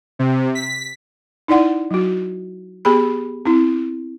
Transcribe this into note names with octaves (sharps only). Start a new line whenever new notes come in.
C3
B6
D#4 E4 D5 F#5
F#3 F#4
B3 G4 G#4 B5
C4 E4